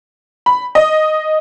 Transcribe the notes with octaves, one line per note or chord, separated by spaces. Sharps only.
B5
D#5